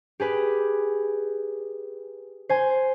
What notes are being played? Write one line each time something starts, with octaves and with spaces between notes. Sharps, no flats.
G4 G#4 B4
C5 G#5